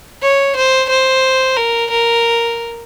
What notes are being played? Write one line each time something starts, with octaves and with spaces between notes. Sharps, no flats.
C#5
C5
C5
A#4
A#4